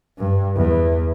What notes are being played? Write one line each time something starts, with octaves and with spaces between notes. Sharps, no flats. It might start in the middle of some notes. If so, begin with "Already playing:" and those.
G2
E2